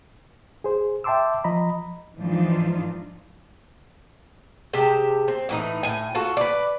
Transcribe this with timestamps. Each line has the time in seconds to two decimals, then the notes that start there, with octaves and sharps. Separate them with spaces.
0.64 G#4 C5
1.04 E5 G5 A5 C6 D6 E6
1.44 F3 D#5 A#5 B5
2.18 G#2 E3 F3 D4 D#4 F4
4.73 C3 G#3 G4 A5
5.28 C4
5.49 A2 E3 D#4
5.83 A2 G#5
6.15 F4 F#4 A4
6.37 B4 D5